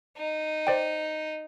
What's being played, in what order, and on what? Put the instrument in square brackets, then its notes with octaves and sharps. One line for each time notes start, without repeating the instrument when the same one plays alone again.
[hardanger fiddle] D#4
[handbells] C5 D5 G5